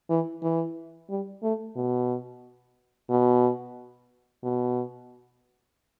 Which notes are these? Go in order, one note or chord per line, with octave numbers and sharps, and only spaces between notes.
E3
E3
G3
A3
B2
B2
B2